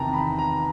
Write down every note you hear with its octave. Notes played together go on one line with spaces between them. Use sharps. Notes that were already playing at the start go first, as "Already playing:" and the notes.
Already playing: E2 C3 D#3 G5 A5 A#5
B5
A#5